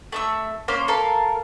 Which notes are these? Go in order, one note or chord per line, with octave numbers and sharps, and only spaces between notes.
A3 E5 E6
A#3 C#4 C5 F5
A4 A#4 F5